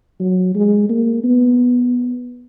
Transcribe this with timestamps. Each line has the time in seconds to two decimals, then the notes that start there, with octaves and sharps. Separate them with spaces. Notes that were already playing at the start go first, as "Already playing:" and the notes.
0.20 F#3
0.55 G#3
0.89 A#3
1.23 B3